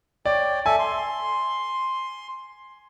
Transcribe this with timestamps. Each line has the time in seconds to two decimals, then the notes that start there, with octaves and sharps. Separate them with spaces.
0.26 C#5 D5 G5
0.66 A4 E5 G#5
0.79 C6